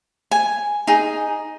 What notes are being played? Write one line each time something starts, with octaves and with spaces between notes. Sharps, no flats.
G#5
D#4 G#4